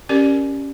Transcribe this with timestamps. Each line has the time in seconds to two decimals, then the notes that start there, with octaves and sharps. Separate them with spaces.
0.09 C#4 G4 A#4 D5